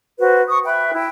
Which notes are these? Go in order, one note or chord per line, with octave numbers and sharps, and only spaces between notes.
F#4 B4 C5
C#6 D#6
B4 E5 G5 B5
E4 G5